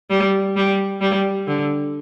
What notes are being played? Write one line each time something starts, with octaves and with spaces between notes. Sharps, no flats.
G3
G3
G3
D3